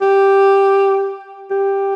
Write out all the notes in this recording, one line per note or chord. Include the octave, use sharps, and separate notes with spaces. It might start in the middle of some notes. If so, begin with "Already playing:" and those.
G4
G4